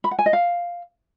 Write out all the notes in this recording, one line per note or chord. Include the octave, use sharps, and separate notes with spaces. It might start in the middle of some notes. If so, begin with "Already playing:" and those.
B5
F#5
G#5
D#5
F5